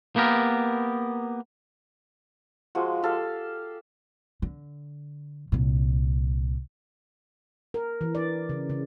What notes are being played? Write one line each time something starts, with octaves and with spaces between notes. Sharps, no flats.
A#3 B3 G4 A#4
F3 G#3 F#4
G4 A4 F5
D3
C2 A#2
A#4
E3
D5
C#3
C#3